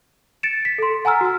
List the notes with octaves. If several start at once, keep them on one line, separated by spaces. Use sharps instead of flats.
A6 C#7 D7 E7
B6
A4 C6
F#5 G#5 A#5 E6 F6
F#4 E6